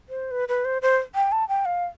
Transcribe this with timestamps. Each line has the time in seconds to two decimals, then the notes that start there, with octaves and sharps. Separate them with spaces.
0.09 C5
0.31 B4
0.49 B4
0.65 C5
0.82 C5
1.15 G5
1.32 A5
1.49 G5
1.65 F5